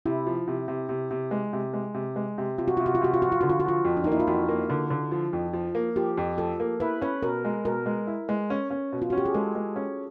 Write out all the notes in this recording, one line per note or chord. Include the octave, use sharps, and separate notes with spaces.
C3 E4
F3
C3
C3
C3
C3
G#3
C3
G#3
C3
G#3
C3
C3 F4
F#4
C3 F4
F#4
F4
C3 F#4
F4
F3 F#4
F4
D3 F#4
F4
F#4
F3 F4
F2
D4
A#3 D#4
E4
F4
F2 F#4
A#3
D3
D3
F3
F2
F3
A#3
F3 G4
F2
F3 A4
A#3
E4 B4
C#4 B4
B2 A#4
G#3
B2 A#4
G#3
E4
G#3
C#4
C#4
B2
F4
C#4 F#4
G4
G#4
G#3 A4
G#3
C#4